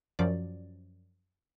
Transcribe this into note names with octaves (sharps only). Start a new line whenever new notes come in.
F#2 F3 D5